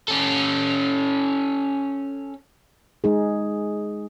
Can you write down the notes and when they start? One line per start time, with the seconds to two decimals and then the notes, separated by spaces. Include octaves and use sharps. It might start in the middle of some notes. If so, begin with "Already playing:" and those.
0.08 C#4 A4
3.04 G#3 D#4 G#4